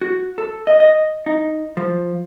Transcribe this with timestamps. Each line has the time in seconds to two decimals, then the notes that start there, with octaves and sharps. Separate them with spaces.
0.01 F#4
0.38 A4
0.67 D#5
0.80 D#5
1.26 D#4
1.77 F3